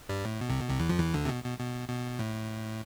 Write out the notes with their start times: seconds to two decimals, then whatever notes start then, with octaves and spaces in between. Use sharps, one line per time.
0.09 G2 G3
0.25 A2
0.41 B2
0.49 C2 C3
0.59 B2
0.69 C2 C3
0.79 E2 E3
0.89 F2 F3
0.99 E2 E3
1.14 D2 D3
1.25 C3
1.29 B2
1.44 B2
1.59 B2
1.89 B2
2.19 A2